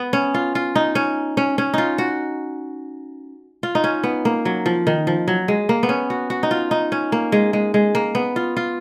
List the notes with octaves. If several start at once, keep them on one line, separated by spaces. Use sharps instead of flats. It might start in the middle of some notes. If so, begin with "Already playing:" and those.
Already playing: B3
C#4
F4
F4
D#4
C#4
C#4
C#4
D#4 F4
F#4
F4
D#4
C#4
B3
A#3
F#3
F3
D#3
F3
F#3
G#3
A#3
B3
C#4
F#4
F#4
D#4
F4
D#4
C#4
A#3
G#3
G#3
G#3
A#3
B3
F4
F4